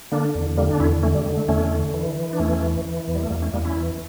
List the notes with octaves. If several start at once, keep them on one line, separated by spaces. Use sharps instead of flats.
D3 A#3 D4
E2
D3 G3 A#3
D4
E2 C#4 E4
D3 A3 C#4
G3
D3 G3
A3
E2 A3 C#4
D3
E3
E3
D4
E2 A3 C#4
E3
E3
E2
G3
A3
E2 G3 A#3
A3 C#4
E2 G3 A#3
C#4 E4
E3